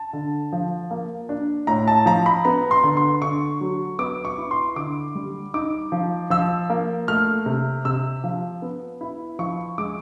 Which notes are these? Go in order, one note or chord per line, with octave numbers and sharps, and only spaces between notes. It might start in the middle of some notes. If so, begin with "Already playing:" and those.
Already playing: A5
D3
F3
A#3
D4
A2 A#5
A5
F3 A#5
B5
B3 A#5
C6
D3
C6
D3 C#6
F#3
B3 D6
C#6
E4
C6
D3 D6
G3
D#4 D6
F3
F3 E6
A#3
A3 F6
C3
C3 E6
F3
B3
E4
F3 C#6
G#3 D6